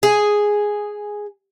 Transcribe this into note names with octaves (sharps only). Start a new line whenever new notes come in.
G#4